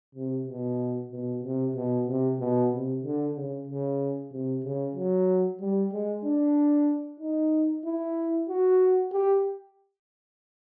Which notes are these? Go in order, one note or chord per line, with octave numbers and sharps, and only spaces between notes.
C3
B2
B2
C3
B2
C3
B2
C3
D3
C#3
C#3
C3
C#3
F#3
G3
G#3
D4
D#4
E4
F#4
G4